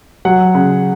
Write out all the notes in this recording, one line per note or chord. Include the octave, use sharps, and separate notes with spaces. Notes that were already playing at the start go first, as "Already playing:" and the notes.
F#3 F#5
C#3